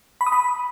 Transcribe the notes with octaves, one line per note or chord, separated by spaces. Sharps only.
B5
D#6
B5